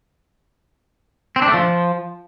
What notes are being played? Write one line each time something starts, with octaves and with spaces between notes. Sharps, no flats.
C4
D4
A3
F3